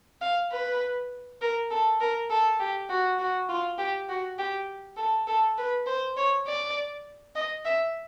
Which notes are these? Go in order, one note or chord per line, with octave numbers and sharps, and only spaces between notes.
F5
B4
A#4
A4
A#4
A4
G4
F#4
F#4
F4
G4
F#4
G4
A4
A4
B4
C5
C#5
D5
D#5
E5